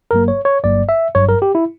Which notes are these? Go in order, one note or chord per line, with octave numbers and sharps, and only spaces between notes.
G1 G2 F#3 A#3 A#4
C#5
C#5
G1 G2 F#3 A#3 D5
E5
G1 G2 F#3 C#5
A#4
G4
E4